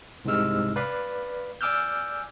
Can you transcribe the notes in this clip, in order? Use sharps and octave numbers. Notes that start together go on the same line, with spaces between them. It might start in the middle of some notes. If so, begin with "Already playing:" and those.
C2 G#2 C3 G#3 E6 F6
B4 D5 F5 B5
D5 G#5 D6 E6 F6 G6